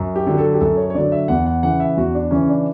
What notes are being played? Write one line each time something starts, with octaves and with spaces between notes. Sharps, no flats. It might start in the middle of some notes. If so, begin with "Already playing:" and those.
Already playing: F#2
G4
D3 F#3
A4
G4
F#2 A4
C#5
C#5
D3 F#3 D5
E5
E2 F#5
F#5
C#3 E3 F#5
E5
E2 F#4
D4
C#3 E3 C#4
D4